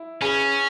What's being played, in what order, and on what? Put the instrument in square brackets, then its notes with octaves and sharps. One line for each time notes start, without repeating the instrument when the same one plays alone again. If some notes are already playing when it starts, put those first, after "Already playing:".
Already playing: [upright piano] E4
[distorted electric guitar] C#4 [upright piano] G#4 B4